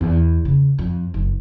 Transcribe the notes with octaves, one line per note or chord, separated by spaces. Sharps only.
E2
C#3
F2
F#1